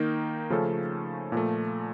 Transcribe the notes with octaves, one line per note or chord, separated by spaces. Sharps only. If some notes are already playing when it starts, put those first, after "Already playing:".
Already playing: D#3 A#3 D#4 A#4
C#3 F3 A3 C#4 A4
A#2 F3 A3